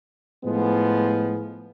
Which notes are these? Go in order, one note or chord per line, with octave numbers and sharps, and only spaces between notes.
A2 F3 G#3 B3